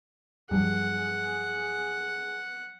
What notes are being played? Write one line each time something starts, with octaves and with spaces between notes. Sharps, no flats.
G2 F3 F#3 G#4 F#5